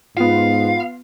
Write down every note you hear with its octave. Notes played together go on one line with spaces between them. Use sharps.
G#2 B3 F4 F5